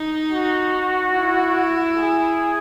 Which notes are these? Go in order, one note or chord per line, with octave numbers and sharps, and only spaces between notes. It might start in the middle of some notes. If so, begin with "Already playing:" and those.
Already playing: D#4
F#4
E4
G#4